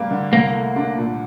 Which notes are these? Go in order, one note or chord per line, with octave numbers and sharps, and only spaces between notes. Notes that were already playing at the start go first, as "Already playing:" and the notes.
Already playing: G2 G3 A#3
D3
C2 A#3
A3
D4
A#2